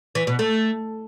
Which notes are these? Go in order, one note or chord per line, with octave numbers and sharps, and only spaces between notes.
E3
B2
A3